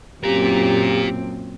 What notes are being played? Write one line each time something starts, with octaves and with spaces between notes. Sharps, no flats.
F#2 A#2 C4 F4 G4 A#4